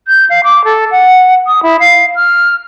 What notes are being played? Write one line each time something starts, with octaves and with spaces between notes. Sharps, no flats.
G6
F5
D6
A4
F#5
D#6
E4
F5
F6